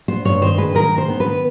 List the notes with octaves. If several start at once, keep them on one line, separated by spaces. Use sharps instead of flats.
B3 C5
G2 C#5
D#3 C5
G#3 B4
D#3 A#4
G#3
C5
B3
B4
D#3